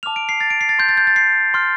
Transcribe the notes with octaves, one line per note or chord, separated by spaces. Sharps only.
A5 D6 F6 F7
D7
C7
A6
D7
C7
A6
C6 G6
A6
G6
A6
C7
C6 F6